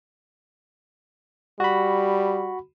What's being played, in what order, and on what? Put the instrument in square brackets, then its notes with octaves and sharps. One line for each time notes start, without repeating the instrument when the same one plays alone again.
[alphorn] G3 [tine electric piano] F#4 B5